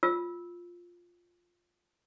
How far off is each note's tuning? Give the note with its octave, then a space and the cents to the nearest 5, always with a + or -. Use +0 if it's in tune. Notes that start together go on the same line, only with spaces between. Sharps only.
F4 +0 E6 -15